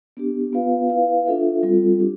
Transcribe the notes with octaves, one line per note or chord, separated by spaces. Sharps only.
B3 D4 G4
B3 F4 B4 F5
E4 B4 F5
D4 F4 A4 E5
G3 C4 F4 A4
D4 G4